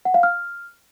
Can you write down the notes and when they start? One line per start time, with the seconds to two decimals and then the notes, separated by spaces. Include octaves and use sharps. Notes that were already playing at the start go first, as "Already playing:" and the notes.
0.05 F#5
0.14 F5
0.23 F6